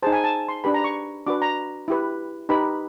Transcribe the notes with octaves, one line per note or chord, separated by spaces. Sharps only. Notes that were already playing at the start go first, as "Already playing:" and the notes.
D#4 G#4 C5 A5
G#5
A5
C6
D4 G4 B4 B5
A#5
C#6
D4 F#4 B4 D6
A#5
E4 G4 B4
D#4 G4 B4 B5